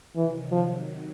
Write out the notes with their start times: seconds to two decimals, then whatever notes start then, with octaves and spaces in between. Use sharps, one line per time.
0.16 C3 D#3 E3 F#3
0.52 F3